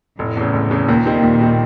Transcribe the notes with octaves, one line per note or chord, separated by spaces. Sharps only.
F1 A2
E2 C#3
F1
E2 C#3
D#2 A#2
D#3 G3 C4 D#4
D#2
D#3 G3 C4 D#4